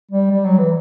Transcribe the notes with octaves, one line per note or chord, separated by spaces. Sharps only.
G3
G3
F#3
E3